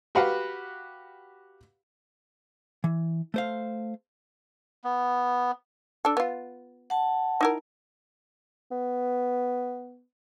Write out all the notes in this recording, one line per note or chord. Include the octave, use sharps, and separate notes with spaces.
F#4 G4 B4 F5 F#5
E3
A3 C5 F5
B3
D4 A4
B3 F4
F#5 A5
D#4 E4 A#4
B3